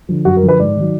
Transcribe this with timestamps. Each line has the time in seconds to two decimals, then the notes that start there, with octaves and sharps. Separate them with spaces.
0.09 D3 F3
0.25 F#2 F#4
0.37 A#4
0.43 D3 F3
0.49 B4
0.60 G#2 D5
0.77 D#3 F#3